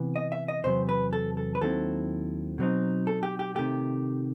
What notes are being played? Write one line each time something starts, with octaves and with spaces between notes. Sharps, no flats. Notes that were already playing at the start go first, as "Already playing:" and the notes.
Already playing: C3 E3 B3
D#5
E5
D#5
E2 C3 F#3 B3 C5
B4
A4
A4
B4
D#2 D#3 F#3 C4 E4 A4
B2 F#3 C4 D#4
A4
G4
G4
C3 D#3 A3 G4